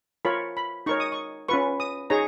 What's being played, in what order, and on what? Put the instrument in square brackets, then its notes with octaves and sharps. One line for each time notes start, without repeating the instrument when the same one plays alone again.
[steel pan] F4 A#4 C#5 B5
B5
D#4 A#4 C#5 C#6
D#6
C#6
C#4 F4 B4 C#6
D#6
D#4 G#4 C#5 A#5